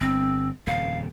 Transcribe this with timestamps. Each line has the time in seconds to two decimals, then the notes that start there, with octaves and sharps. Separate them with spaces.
0.01 G1 C4
0.67 D#1 F2 C#3 F5